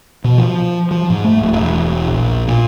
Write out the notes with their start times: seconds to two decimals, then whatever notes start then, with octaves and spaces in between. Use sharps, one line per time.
0.24 B2
0.38 F3
0.91 F3
1.10 G#2
1.24 A3
1.39 D1
1.53 E1
2.08 A#1
2.48 A#2